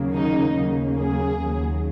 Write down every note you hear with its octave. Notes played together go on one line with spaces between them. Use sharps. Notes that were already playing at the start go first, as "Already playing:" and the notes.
Already playing: D#2 C#3 F#3 A#3
D#4
D#2 C#3 F#3 A#3
G#4
D#2 C#3 F#3